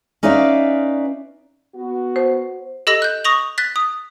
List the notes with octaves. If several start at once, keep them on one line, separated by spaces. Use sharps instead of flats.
C#4 D#4 B4 D5 E5 F5
B3 F#4
C5
G4 A4 D#5 E6 A#6 F#7
F#6 G6
C#6 D#6 A#6 F7 F#7
F#6 A6 B6
D#6